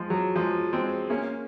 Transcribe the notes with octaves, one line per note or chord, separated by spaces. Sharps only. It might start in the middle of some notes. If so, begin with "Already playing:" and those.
Already playing: F3 G#3
F#3
F3 G#3
G#3 C4
A#3 C#4